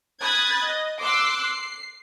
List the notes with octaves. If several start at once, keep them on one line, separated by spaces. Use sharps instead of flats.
B5 D#6 F#6 G#6 A6
D#5
C6 D6 E6 F#6 C7
C7